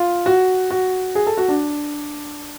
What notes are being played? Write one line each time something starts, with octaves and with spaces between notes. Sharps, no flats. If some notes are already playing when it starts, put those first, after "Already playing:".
Already playing: F4
F#4
F#4
G#4
A4
F#4
D4